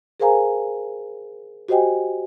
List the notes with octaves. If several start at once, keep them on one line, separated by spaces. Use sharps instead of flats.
G#4 A#4 C5 F5 G#5 A#5
F#4 G4 C5 D#5 G5 G#5